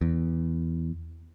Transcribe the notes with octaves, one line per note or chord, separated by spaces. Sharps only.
E2